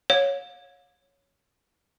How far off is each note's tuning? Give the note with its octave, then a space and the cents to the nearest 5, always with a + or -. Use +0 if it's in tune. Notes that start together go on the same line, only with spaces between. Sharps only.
C#5 +0 F5 +35